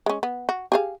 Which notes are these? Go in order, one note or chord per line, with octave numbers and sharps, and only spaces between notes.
G#3 C#4
B3
F#4
G4 G#4 F5